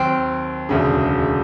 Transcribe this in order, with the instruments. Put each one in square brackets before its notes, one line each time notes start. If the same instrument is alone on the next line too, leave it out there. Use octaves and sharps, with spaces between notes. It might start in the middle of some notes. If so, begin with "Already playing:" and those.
Already playing: [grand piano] D#2 F#3 [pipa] C4
[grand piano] E1 D2 C#3